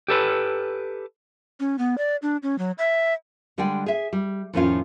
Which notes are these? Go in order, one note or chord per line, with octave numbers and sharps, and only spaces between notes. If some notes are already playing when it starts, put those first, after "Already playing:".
G4 A4 B4
C#4
B3
D5
D4
C#4
F#3
E5
D3 G3 G#3 D5 G5
G#4 E5
G3
F2 A2 D#3 C#4 F4